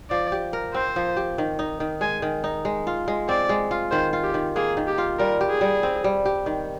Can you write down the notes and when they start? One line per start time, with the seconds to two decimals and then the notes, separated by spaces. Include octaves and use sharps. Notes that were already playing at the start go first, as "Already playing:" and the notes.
0.10 F3 D5
0.32 G4
0.53 A#4
0.74 C4 C5
0.96 F3
1.17 G4
1.38 D#3
1.59 D#4
1.80 D#3
2.01 G#3 G#5
2.22 D#3
2.44 D#4
2.65 G#3
2.87 F4
3.08 G#3
3.29 C4 D5
3.49 G#3
3.71 F4
3.91 D#3 C5
4.13 F4
4.24 G4
4.34 D#3
4.56 A#3 G#4
4.77 D#3
4.87 G4
4.98 F4
5.19 G3 A#4
5.41 G4
5.50 G#4
5.61 G3
5.83 C4
6.04 G3
6.25 G4
6.46 D#3